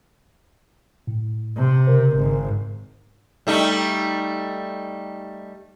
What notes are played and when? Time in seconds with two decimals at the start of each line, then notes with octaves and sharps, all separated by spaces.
1.07 A2
1.56 C3
1.87 C#3 A#4 C5
2.17 G#1
3.47 G3 A3 D#4